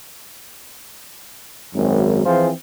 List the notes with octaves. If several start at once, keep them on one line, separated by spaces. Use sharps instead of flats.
G#1 F#2
E3 F3 C4 F4 G#4 C5